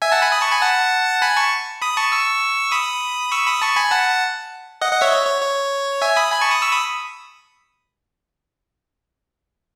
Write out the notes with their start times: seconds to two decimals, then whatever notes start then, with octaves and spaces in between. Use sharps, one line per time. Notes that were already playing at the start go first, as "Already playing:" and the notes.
0.02 E5 G#5
0.12 F#5 A5
0.22 G#5 B5
0.32 B5 D#6
0.41 A5 C#6
0.52 G#5 B5
0.62 F#5 A5
1.22 G#5 B5
1.37 A5 C#6
1.82 B5 D#6
1.97 A5 C#6
2.12 C#6 E6
2.71 B5 D#6
3.32 C#6 E6
3.47 B5 D#6
3.62 A5 C#6
3.76 G#5 B5
3.91 F#5 A5
4.81 D#5 F#5
4.92 D#5 F#5
5.01 C#5 E5
5.11 C#5
5.27 C#5
5.42 C#5
6.02 E5 G#5
6.16 B5 D#6
6.32 G#5 B5
6.41 A5 C#6
6.51 B5 D#6
6.62 C#6 E6
6.72 B5 D#6